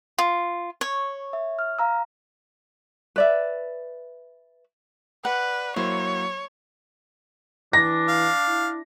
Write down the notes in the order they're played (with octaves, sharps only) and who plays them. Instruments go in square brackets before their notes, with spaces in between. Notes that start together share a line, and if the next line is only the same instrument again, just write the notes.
[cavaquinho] F4
[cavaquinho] C#5 [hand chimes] C#6
[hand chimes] E5
F6
F5 A#5 E6
[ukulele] B4 D5 E5
[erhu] B4 [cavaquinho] D5 F#5
[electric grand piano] F#3 A#3 E4 [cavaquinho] C5 [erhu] C#5
[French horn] E3 [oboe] D4 [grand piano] A#6
[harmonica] F5
[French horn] E4